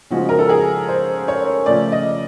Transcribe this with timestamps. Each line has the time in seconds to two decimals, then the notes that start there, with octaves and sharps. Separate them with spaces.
0.10 C#3 F3 G#3 F#4
0.29 A#4
0.39 A4
0.49 G#4
0.88 C5
1.28 C#5
1.66 C#3 F3 A3 D5
1.92 D#5